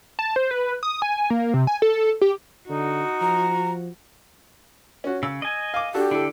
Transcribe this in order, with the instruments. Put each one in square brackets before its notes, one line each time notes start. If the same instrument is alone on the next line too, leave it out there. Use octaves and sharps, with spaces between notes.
[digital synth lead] A5
C5
B4
D#6
G#5
A#3
C3
G#5
A4
G4
[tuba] D3 [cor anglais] D#4 [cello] F#4
[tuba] F3 [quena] A#5
[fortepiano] C#4 F#4
[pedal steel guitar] C#3 [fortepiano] E6
[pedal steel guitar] D#5 G#5
[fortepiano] F5 D6
[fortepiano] D4 F#4 A4 [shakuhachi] G4
[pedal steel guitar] D3 [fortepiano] E4 A4